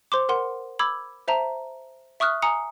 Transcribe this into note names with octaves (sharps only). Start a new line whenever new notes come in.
C5 C6 D6
A#4 F#5 C6
B5 D6 E6 G#6
C5 E5 A5 A#5
E5 C#6 D#6 F6 F#6
G#5 A#5 D#6 C#7